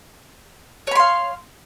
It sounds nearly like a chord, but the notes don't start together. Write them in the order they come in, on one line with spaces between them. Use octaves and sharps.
C#5 B5 C6 F5